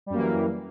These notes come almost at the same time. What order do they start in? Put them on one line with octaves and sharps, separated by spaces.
G3 F#2 A#3 E3